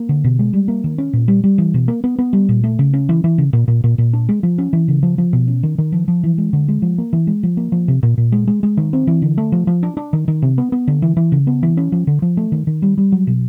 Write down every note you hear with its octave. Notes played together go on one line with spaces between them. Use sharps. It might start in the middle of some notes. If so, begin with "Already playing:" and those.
Already playing: A#3
D3
B2
G#3
G3
A#3
D#3
C#4
A#2
G3
G3
E3
B2
A#3
B3
B3
G3
A#2
A3
C#3
C#4
E3
E3
C#3
A#2
A#2
A#2
A#2
D4
G#3
F3
C#4
E3
C#3
F3
F3
B2
C#4
D#3
D#3
F3
F3
E3
G#3
D3
G#3
F3
A#3
E3
G#3
F3
A#3
F3
C3
A#2
A#2
G#3
G#3
G#3
D#3
C4
E3
D3
A3
F3
F3
D4
D4
D#3
D#3
C3
B3
B3
D3
E3
E3
C#3
B3
E3
C#4
F3
D3
F3
A3
D#3
D#3
G3
G3
F#3
B2